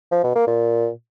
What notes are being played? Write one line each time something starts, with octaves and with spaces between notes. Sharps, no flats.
F3
B2
A#3
A#2